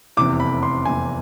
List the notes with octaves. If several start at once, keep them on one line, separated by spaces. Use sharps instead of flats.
F1 E2 C3 E3 D6
B5
C6
F1 E2 C3 E3 G#5